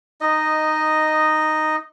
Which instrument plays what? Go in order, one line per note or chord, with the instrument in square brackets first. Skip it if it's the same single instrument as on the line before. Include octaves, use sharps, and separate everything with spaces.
[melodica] D#4 D#5